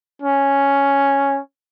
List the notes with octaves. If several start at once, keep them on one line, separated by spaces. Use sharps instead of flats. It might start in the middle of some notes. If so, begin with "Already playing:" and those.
C#4